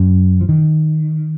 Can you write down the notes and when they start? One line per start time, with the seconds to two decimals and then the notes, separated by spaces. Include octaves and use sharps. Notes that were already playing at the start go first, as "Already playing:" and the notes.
Already playing: F#2
0.41 F3
0.49 D#3